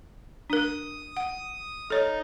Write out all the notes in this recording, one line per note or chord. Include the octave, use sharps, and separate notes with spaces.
D4 A#4 D#6
F#5
D#4 A4 C#5